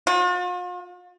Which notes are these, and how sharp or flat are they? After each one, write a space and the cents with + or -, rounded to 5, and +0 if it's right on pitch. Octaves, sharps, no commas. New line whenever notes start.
F4 +45